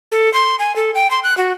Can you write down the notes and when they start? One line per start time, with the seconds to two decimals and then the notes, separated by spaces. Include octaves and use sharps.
0.12 A4
0.34 C6
0.59 G#5
0.76 A4
0.95 G5
1.11 C6
1.24 F#6
1.37 F#4